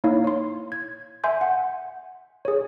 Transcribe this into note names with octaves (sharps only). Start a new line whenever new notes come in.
A#3 D#4 E4 C#5 F5
C#5 C6
G#6
E5 G#5 C6 G6
F#5
G#4 C#5